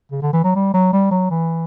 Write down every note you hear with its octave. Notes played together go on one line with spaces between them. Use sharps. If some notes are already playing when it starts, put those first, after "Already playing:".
C#3
D3
E3
F#3
G3
F#3
G3
F#3
E3